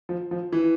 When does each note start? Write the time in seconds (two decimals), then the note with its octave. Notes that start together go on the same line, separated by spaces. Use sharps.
0.09 F3
0.31 F3
0.52 E3